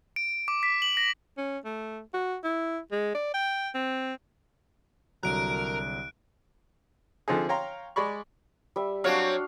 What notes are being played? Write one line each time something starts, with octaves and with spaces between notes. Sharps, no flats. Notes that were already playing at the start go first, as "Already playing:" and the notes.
D7
D6
B6
F#7
A#6
C#4
A3
F#4
E4
G#3
D5
G5
C4
C2 D3 F#3 A#4 A#5 F#6 D7
D3 F3 C4 D#4 G#4
C#5 F5 G5 A#5 C6
G#3 D5 B5 C#6
G3 E5
F#3 C4 D4 F#4 C#5 F5